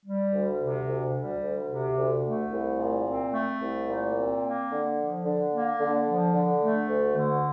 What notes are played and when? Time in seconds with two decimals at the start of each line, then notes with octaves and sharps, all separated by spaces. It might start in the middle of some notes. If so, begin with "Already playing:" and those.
0.06 G3
0.33 D2
0.60 C3
0.88 D2
1.15 G3
1.42 D2
1.69 C3
1.97 D2
2.24 A3
2.52 C2
2.78 A#2
3.06 C4
3.33 A3
3.61 C2
3.88 A#2
4.16 C4
4.42 A#3
4.70 D3
4.98 F3
5.25 D3
5.52 A#3
5.79 D3
6.07 F3
6.34 D3
6.62 A3
6.88 D2
7.16 D3